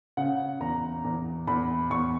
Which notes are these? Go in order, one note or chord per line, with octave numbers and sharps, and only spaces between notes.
C#3 F#5
E2 A#5
E2
E2 B5
E2 C#6